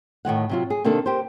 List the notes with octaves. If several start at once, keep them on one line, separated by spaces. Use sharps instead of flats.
A2 D#3 G#3 F#5
C3 F#3 F4
G#4
C3 D#3 A#3 D4 A4
G4 A#4 C5